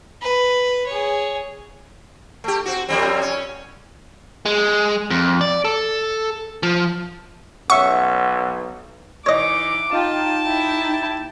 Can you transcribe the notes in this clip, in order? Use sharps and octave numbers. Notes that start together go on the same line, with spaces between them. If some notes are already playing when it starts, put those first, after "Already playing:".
B4
G#4 C#5
A3 G4
C4 F#4
F2 G3 C4
C#4
G#3
F2
D5
A4
F3
B1 C#4 E5 F#5 C#6
E3 D#4 C#5 D#5 D6
D#4 F4 G4 G5 A5
E4